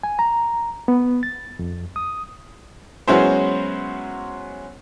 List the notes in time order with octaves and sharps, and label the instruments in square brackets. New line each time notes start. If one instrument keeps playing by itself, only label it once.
[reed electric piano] G#5
A#5
B3
A6
F2
D#6
[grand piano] F#3 G#3 B3 C#4 E4 C5